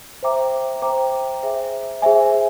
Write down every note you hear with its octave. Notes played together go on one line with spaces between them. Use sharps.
C5 E5 G5 A#5 D6
C5 E5 G5 A#5 D6
G#4 C5 E5 G#5
G#4 C5 E5 G#5